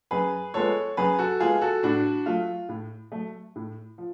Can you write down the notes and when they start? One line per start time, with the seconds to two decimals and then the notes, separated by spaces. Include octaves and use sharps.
0.11 F#2 G#4 B4
0.54 F3 G#3 B3 A4 C#5
0.97 F#2 G#4 B4
1.19 F#4 A4
1.40 F3 G#3 B3 F4 G#4
1.61 F#4 A4
1.83 A2 D4 F#4
2.26 F#3 A3 F4
2.69 A2
3.12 F#3 A3
3.56 A2
3.98 F3